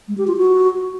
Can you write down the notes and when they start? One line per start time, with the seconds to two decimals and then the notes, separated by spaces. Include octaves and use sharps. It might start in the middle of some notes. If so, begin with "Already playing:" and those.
0.08 G#3
0.18 G4
0.27 F4
0.37 F#4